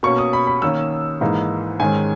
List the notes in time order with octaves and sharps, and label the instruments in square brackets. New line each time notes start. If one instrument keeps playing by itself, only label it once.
[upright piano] B2 A#3 C#4 C#6
D#6
B5
B5
D#3 A#3 C#4 E6
G#2 E3 A#3 D#4
G#2 D#3 G#3 C#4 G#5